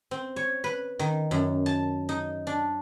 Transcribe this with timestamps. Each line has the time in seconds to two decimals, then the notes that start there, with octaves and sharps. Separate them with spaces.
0.11 C4
0.36 C#5
0.64 B4
0.99 D#3
1.31 F#2
1.66 A5
2.09 D#4
2.47 D4